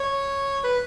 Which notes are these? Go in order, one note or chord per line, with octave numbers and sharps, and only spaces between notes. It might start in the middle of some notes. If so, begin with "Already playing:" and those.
Already playing: C#5
B4